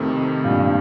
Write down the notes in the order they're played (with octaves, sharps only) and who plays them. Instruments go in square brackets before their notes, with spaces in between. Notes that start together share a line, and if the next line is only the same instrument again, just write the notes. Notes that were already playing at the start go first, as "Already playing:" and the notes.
Already playing: [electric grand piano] F2 C3 D#3 A3
[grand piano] G2 A#2